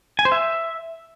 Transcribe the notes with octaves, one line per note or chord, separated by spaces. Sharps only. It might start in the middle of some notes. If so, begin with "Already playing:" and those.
G#5
C5
E5